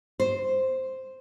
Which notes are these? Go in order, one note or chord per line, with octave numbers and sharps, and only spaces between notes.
C5